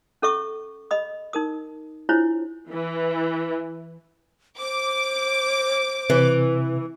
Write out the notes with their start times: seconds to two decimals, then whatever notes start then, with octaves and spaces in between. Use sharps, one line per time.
0.22 C#4 A4 E5 C#6 D#6
0.91 D#5 B5 D#6
1.33 D#4 A#4 D#6
2.09 D4 E4 F4 C5 C#5
2.70 E3
4.58 C5 D6
6.10 C3 E3